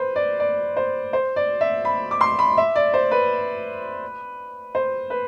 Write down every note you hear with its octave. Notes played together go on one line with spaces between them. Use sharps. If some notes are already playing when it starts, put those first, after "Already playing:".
Already playing: B4 C5
D5
D5
C5
C5
D5
E5
B5
D6
C6
B5
E5
D5
C5
B4
C5
B4